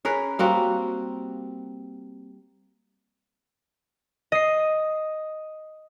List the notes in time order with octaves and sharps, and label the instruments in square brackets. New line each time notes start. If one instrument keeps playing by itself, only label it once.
[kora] C#4 G#4 A#4 B4
G3 A#3 C4 F#4
[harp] D#5 C7